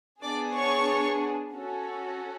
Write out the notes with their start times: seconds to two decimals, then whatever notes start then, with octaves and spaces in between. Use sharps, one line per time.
0.22 B3 D4 G#4 D5 D6
0.55 C#5 C#6
1.53 C#4 F#4 A4